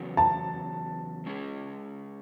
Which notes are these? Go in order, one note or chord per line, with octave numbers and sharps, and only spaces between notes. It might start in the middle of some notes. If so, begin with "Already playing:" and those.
Already playing: E2 C#3 F#3 B3
A5
G#3 C#4 G#4